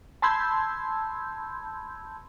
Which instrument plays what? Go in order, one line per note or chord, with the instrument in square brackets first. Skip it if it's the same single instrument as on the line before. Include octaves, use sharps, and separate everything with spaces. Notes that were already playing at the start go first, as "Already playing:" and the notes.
[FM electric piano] A5 B5 C6 E6 G6 G#6